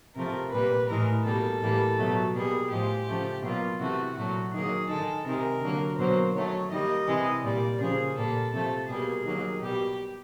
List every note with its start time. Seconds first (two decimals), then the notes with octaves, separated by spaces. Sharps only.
0.15 C3 F3 A3 A#4
0.52 A#2 G3 A#3 B4
0.88 A2 E3 G#3 A#4
1.25 B2 G3 A#3 A4
1.61 A2 E3 G3 A#3
1.98 B2 F#3 A3
2.34 B2 G3 A#3 G#4
2.70 A2 F3 G#3 G4
3.07 C#3 F3 A3
3.43 B2 F#3 A#3 F4
3.80 C3 E3 A3 F#4
4.16 A#2 F#3 A3 F#4
4.53 D#3 F#3 A#3 G#4
4.88 D#3 G#3 A4
5.25 C3 D#3 G#3 A#4
5.61 D3 F#3 A#3
5.98 B2 F#3 A#3 C5
6.34 D#3 F#3 A3 C#5
6.71 D#3 G3 A#3 D#5
7.07 C3 E3 G#3
7.43 A#2 G3 A#3 D5
7.80 C#3 F3 A#3 G#4
8.16 A#2 G3 A#3 A4
8.52 C3 F3 A3 A4
8.89 B2 G3 A#3 G#4
9.26 D#3 F#3 A#3
9.61 B2 G3 A#3 G4